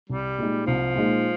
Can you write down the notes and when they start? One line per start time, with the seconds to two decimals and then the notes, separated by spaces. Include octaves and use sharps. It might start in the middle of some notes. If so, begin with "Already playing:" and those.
0.09 C2 G3
0.38 A#2 G#3 D#4
0.67 C2 F3
0.96 A#2 G#3 D#4